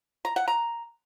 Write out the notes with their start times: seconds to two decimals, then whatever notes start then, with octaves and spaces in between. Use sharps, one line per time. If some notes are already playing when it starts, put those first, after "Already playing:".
0.25 A#5
0.36 F#5
0.48 A#5